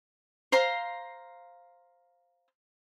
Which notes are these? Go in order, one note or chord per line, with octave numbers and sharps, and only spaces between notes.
C5 F5 A#5 C6